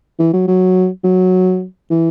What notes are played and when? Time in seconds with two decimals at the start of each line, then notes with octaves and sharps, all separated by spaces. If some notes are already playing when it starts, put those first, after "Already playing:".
0.19 E3
0.33 F#3
0.48 F#3
1.04 F#3
1.91 E3